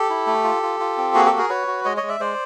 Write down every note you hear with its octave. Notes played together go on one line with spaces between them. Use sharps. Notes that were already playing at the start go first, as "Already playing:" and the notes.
Already playing: G4 A4
E4
A3
F4
F4
F4
C4
A#3 F#4 G#4
G4 A4
F#4
G#4 A#4
F#4 B4 C#5
F#4
G#3 C#5 D#5
C#5 D#5
G#3
D5 E5
G#3 C5 D5